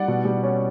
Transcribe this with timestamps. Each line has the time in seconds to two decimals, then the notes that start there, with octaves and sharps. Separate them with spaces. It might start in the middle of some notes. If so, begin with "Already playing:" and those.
Already playing: G3 D5 F#5
0.08 B2
0.25 G3
0.43 C#4